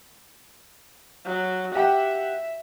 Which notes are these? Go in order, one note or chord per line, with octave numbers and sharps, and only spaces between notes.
F#3
G4 E5 F#5 G5